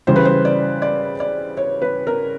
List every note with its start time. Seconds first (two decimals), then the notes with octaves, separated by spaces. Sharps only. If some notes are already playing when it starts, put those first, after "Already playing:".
0.07 C#3 E3 G3 C5
0.16 B4
0.25 C5
0.45 D5
0.82 D5
1.20 D5
1.57 C#5
1.82 B4
2.07 A#4